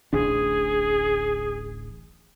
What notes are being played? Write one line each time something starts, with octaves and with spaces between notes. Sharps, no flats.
D1 A1 D4 G#4